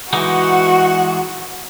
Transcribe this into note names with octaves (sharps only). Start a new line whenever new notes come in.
E3 G#3 D#4 F#4 F#5